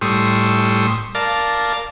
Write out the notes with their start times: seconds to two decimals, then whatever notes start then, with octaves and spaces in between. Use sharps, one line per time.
0.01 A2 G3 C6 C#6 D#6 E6
1.15 A#4 D5 F5 A5